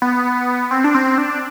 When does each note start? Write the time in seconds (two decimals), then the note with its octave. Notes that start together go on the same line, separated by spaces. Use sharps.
0.02 B3
0.71 C4
0.84 D4
0.95 C4
1.18 D4